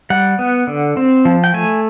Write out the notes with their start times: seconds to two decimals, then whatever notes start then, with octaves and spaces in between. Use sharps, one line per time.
0.10 G3 F#5
0.39 B3
0.67 D3
0.97 C4
1.25 F3
1.44 G5
1.54 A3 G#5